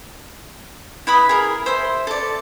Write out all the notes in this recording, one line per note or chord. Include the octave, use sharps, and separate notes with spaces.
E4 B4 B5 D#6
G#4 A#4
C5 E5 C6
A4 D5